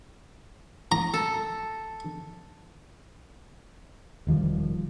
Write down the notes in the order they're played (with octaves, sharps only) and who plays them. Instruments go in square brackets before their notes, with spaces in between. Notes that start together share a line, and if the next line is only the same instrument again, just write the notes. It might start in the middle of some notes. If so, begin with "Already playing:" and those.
[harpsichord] A#5
[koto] A4
[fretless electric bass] E1 D#3 F3 G3